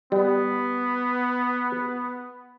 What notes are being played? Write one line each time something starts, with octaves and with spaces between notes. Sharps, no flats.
G3 B3